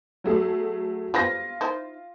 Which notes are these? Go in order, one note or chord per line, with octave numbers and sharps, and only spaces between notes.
F#3 A3 G#4
G3 F4 B4 C5 A#6
D#4 E4 C5